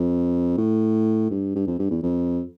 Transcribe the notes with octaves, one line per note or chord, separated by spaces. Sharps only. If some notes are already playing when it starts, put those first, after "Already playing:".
Already playing: F2
A2
G2
G2
F2
G2
E2
F2